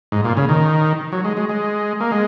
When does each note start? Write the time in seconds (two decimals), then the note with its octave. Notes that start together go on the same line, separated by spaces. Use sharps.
0.12 G#2
0.24 A#2
0.37 C#3
0.49 D#3
1.12 F#3
1.25 G#3
1.37 G#3
1.49 G#3
2.00 A#3
2.12 G#3